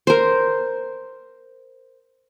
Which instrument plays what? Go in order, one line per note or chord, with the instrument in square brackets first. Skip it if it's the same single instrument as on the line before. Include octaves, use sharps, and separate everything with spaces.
[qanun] A#4 C5